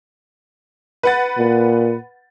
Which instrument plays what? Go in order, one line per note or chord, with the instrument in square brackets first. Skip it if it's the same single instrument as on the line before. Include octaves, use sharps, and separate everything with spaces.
[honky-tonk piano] B4 F#5 A6
[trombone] A#2